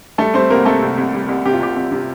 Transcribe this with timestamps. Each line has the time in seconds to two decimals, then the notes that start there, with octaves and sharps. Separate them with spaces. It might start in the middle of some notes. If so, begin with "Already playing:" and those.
0.18 G3 A3 A4
0.34 G3 C4 C5
0.50 C2 A#3 A#4
0.66 C3 A3 A4
0.82 C2
0.98 C2
1.13 G3
1.29 C2
1.46 C3 G4
1.54 F4
1.60 C2 G4
1.76 C2
1.92 C3